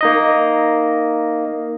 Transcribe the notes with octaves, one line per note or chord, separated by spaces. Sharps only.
A#3 D#4 D#5